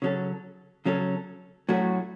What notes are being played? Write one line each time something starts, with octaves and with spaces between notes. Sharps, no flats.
C#3 F#3 C#4 A4
C#3 F#3 C#4 A4
A2 F#3 A3 C#4 F#4